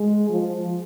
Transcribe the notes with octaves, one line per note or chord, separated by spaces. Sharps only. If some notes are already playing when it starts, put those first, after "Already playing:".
Already playing: G#3
F3